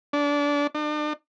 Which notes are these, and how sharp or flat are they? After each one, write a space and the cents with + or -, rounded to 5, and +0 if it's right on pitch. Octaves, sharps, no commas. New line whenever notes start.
D4 -25
D4 +40